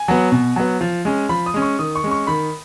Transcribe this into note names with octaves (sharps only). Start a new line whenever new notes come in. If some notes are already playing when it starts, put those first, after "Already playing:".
Already playing: G#5
F#3 B3
B2
F#3 B3
F3
G#3 C#4
F3 B5
D#6
G#3 C#4
C#6
D#3 D#6
C#6
G#3 C#4
C#6
D#3 B5